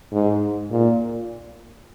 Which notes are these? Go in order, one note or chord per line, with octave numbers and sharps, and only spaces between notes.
G#2
A#2